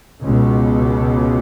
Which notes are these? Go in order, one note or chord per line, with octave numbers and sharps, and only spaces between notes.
C#2 B2